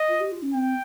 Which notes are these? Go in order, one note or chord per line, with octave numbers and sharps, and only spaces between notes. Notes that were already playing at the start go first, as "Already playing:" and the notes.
Already playing: D#5
F4
G4
F4
C#4
C4 G5